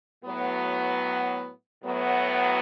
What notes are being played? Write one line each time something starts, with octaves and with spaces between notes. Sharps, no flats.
A2 F#3 B3
A2 F#3 B3